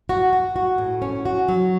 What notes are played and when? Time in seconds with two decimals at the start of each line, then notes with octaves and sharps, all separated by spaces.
0.09 F#4
0.33 F#4
0.56 F#4
0.78 A2
1.02 C#4
1.26 F#4
1.48 F#3